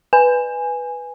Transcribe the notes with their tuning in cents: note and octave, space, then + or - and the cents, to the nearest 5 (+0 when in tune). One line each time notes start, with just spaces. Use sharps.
B4 +0 G#5 -5